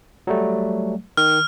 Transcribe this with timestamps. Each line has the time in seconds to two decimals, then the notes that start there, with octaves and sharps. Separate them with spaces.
0.27 F#3 G3 A3
1.17 D#3 F6